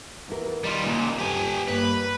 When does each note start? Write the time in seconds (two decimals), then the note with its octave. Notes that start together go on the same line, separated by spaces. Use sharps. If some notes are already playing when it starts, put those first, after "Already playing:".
0.28 E2 E4 A#4
0.64 D#3 G3 F4
0.83 C#2 A#2 A#3 C#4
1.19 D2 G2 G4 G#5
1.68 G2 A#3 B4 C#5